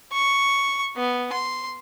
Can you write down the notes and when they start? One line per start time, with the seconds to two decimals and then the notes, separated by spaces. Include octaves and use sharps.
0.13 C#6
0.96 B3
1.32 C6